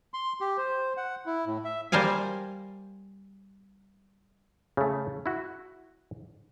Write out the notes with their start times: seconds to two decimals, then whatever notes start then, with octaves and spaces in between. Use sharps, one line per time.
0.14 C6
0.41 G4
0.57 C5
0.97 F#5
1.26 E4
1.46 A2
1.64 E5
1.92 G3 A#3 C5 F5 G#5
4.77 C#3 A3
5.26 E4 F#4